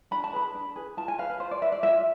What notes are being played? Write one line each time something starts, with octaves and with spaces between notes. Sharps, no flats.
D4 B5
A5
G#4 B4 B5
D4
G#4 B4
F4 A5
G#5
B4 F5
B4
F4 C5
D5
B4 E5
D5
F4 E5